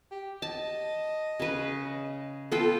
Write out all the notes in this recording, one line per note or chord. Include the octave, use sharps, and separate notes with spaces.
G4
D#5 A5
C#3 B4
B3 F4 A4 G5